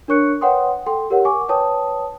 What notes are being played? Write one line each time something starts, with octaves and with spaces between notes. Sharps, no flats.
D4 A#4 C#5 C#6 F#6 C#7
B4 C#5 F#5 G5 C6 D#6
A4 G5 C6
G4 A#4 C#5 F#5
G#5 C#6 D6
B4 C#5 G5 A5 D#6